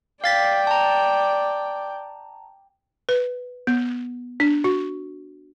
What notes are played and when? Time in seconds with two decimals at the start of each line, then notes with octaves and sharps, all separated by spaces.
0.24 D5 F5 G5 A6 B6
0.67 A5 A#5
3.09 B4
3.67 B3
4.40 D4
4.64 F#4